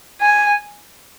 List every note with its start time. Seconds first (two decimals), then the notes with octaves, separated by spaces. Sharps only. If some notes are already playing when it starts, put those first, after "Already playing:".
0.21 G#5